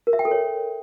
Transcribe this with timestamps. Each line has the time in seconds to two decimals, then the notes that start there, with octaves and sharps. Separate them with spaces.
0.07 A#4
0.13 E5
0.19 G5
0.25 A4
0.31 C#5